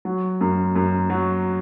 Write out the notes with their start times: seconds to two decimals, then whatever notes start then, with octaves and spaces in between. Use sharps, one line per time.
0.05 F#3
0.41 F#2
0.76 F#2
1.10 F#3